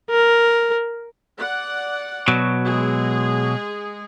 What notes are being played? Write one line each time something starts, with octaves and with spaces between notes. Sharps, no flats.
A#4
D5 F#5
B2 F#3
G#3 G#4